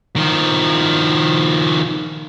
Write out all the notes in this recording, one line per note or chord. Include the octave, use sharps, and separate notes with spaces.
D#3 F3